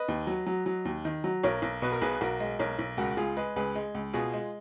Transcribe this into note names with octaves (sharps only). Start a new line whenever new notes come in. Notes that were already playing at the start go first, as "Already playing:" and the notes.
Already playing: B4 D#5
D#2
F#3
F#3
F#3
D#2
D#3
F#3
B1 A#4 C#5
B1
B2 B4
A#4
B1 G#4 B4
B1 F#4 A#4
G#3
B1 A#4 C#5
B1
C#2 F#4 A#4
C#2 F4 G#4
G#3 G#4 B4
C#2 G#4 B4
G#3
C#2
B2 F4 G#4
G#3